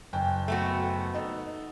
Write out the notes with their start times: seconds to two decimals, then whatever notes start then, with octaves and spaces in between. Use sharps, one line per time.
0.13 F#1 G5 G#5
0.48 A3 B3 F#4
1.14 D#4 A4